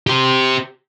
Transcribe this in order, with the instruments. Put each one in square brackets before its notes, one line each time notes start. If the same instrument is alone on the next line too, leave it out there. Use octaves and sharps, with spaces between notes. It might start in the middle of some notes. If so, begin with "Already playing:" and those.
[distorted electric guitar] G4 C5